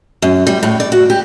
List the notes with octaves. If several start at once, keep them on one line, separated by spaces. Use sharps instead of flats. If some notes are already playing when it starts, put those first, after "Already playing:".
F#2
G3
A2
D5
F#4
G4